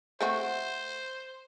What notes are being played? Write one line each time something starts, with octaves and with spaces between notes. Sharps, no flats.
A3 C4 F#4 C5